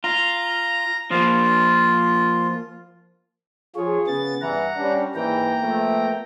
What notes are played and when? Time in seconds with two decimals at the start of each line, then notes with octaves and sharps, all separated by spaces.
0.04 F4 A#5
1.11 F3 A#3 F4
3.76 F3 F4 G#4 C#5
4.07 C#3 B3 A6
4.42 G2 E3 F#5 A#5
4.77 G3 C#4 D4
5.15 G#2 E3 A#3 G5 A#5
5.60 F3 A3 B3